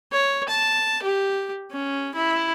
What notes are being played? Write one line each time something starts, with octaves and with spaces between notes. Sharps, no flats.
C#5
A5
G4
C#4
E4